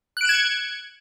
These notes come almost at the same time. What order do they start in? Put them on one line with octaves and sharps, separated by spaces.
F#6 D7 E7 G#6 C#7